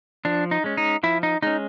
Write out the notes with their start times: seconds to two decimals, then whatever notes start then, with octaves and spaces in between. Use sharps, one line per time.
0.25 F3 D4
0.51 D#4
0.64 G#3 C#4
0.77 D#4
1.03 F3 E4
1.23 D#4
1.42 G#3 C#4 D#4